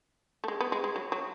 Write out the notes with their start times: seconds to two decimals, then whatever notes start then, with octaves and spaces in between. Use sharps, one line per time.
0.44 A3
0.48 G#3
0.60 B3
0.72 G#3
0.84 G#3
0.96 F#3
1.12 F#3